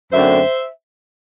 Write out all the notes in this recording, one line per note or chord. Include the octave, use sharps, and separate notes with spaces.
F#2 D3 A3 C4 C5 E5